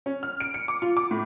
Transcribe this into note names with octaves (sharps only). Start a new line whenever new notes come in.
C#4
F6
D7
C#7
D6
F4
D6
A2